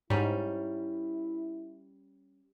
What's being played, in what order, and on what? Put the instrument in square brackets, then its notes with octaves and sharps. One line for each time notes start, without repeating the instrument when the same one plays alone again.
[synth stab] G#2 [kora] G3 C#4 [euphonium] E4